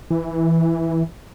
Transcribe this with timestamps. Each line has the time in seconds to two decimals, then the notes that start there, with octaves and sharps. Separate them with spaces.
0.10 E3